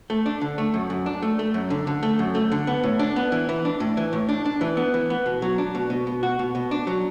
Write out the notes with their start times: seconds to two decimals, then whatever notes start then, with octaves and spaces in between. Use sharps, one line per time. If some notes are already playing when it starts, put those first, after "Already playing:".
0.10 A3
0.26 D4
0.41 D3
0.58 A3
0.74 F#2
0.90 F#2
1.06 D4
1.22 A3
1.39 A3
1.54 F#2
1.70 D3
1.87 D3
2.03 A3
2.19 F#2
2.35 A3
2.52 D3
2.67 B3
2.83 A2
2.99 D4
3.16 B3
3.32 E3
3.49 E3
3.65 D4
3.80 A2
3.97 E3
4.13 A2
4.29 D4
4.46 D4
4.61 E3
4.77 B3
4.94 E3
5.10 B3
5.26 B2
5.42 F#3
5.58 D4
5.75 B2
5.90 B2
6.07 B2
6.23 F#4
6.39 B2
6.55 B2
6.71 D4
6.87 F#3